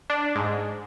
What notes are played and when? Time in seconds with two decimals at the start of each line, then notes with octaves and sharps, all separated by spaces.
0.10 D4
0.36 G#2